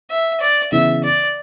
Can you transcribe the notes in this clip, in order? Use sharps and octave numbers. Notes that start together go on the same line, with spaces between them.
E5
D5
C#3 E3 B3 E5
D5